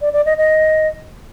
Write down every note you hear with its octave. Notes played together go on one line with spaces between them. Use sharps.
D5
D5
D#5
D#5